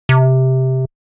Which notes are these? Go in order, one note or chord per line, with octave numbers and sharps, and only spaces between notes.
C3